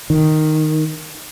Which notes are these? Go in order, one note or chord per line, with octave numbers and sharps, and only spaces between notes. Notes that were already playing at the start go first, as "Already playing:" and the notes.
D#3